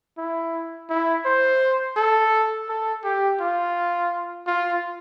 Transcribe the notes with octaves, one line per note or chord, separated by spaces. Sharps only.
E4
E4
C5
A4
A4
G4
F4
F4